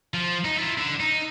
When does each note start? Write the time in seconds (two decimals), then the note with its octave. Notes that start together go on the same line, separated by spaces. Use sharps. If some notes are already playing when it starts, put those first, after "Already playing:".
0.14 F3
0.44 D#4
0.56 E4 F4
0.78 D3
1.00 D#4